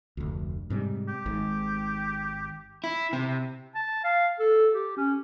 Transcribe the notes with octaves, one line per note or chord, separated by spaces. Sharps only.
F1 D2
G#2 C3 G3
G4
G#1 G#2
E4
C3
A5
F5
A4
G4
C#4